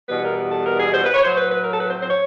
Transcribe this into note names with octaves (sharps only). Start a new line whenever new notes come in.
E2 B2 G3 B4
A#4
A4
A#4
G#4
C5
B4
C#5
A2 F#3 C5
B4
B4
A#4
A4
B4
C5
C5
C#5